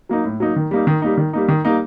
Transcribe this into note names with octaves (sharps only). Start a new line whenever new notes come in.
F#3 A#3 D#4
A2
F#3 A#3 D#4
D#3
G3 A#3 D#4
D#3
G3 A#3 D#4
D#3
G3 A#3 D#4
D#3
G3 A#3 D#4